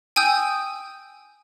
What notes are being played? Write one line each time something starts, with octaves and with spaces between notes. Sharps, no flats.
G5 G#5 D#6 E6 G6